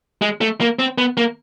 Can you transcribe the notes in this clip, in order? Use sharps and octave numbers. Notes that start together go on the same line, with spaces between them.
G#3
A3
A#3
C4
B3
A#3